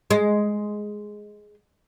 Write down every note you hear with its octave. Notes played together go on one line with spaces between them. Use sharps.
G#3